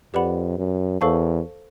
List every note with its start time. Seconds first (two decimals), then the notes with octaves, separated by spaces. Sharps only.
0.14 F2 G4 B4 D5 F#5 B5
0.58 F#2
1.01 E2 A4 C5 F5 A5 C#6